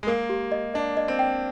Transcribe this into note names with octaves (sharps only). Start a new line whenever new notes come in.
G#3
A#3 A#4
G4
D#5
D4 D#5
D#5
C4
G5